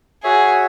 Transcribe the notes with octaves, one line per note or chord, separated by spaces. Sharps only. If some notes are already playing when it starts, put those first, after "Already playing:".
F#4 G#4 C#5 E5